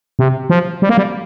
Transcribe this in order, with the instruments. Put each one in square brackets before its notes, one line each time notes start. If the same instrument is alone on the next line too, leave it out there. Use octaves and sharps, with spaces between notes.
[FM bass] C3
F3
G3
A#3
G3